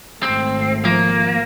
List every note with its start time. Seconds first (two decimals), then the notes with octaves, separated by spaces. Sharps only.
0.23 G#1 A3 C4
0.85 F3 A#3